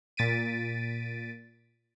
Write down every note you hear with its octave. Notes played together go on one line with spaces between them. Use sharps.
A#2 A6 B6 D7 D#7